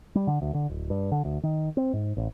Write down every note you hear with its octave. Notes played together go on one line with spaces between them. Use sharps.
G3
D3
D2
D3
D1
G2
D3
D2
D#3
C4
G#2
A1